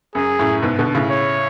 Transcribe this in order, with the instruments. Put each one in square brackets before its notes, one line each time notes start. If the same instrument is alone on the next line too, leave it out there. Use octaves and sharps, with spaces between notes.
[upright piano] F#2 [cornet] G#4
[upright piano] F#2 A2
G#2 B2
B2 D3
A2 C#3
[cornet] C#5